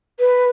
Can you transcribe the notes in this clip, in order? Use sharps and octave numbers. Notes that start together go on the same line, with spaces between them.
B4